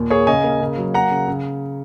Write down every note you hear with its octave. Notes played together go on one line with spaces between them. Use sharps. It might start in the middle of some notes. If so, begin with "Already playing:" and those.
Already playing: D#2 A#2
A#3 G#4 C#5
C#3 D#5 G#5
A#3
C#3
F#3
A#3 F#5 A#5
C#3
C#3